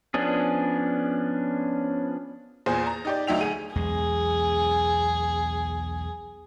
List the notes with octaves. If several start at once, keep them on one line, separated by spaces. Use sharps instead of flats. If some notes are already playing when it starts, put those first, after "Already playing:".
F3 B3 C#4 D4 G#4
E2 A#2 G#4 C5 G#5
A#5
D#4 G4 D5
D2 F#3 D#4 E5 G5 F7
D2 G#4 D#7
B1 E2 G#3 G#4